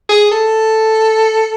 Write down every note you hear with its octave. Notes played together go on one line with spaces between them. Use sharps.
G#4
A4